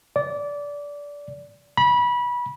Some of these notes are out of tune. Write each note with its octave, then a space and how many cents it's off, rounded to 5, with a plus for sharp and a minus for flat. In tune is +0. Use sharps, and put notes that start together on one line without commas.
D5 -20
B5 -25